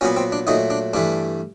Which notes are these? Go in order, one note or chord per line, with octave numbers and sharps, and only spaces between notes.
A#2 F#3 B3 C#4
C4
D4
A#2 F#3 A3 D#4
D4
G2 E3 A3 D4